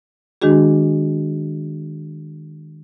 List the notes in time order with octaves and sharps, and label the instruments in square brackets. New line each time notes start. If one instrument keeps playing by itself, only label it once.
[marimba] D#3 G#3 D4 F#4 G#4